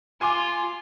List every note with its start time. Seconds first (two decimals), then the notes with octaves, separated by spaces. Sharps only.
0.21 F4 G#5 C6 D6